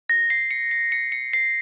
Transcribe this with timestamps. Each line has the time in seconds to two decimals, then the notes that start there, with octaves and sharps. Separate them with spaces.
0.10 A#6
0.30 C7
0.51 C#7
0.71 C7
0.92 C#7
1.12 C#7
1.33 C7